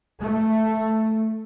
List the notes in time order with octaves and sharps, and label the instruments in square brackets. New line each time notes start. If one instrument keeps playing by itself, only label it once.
[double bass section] A3